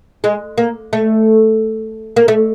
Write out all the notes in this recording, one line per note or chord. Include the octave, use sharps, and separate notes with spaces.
G#3
A#3
A3
A#3
A3